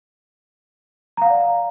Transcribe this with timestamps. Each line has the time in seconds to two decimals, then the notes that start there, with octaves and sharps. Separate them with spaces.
1.17 A#5
1.22 F5
1.26 F#5
1.30 D5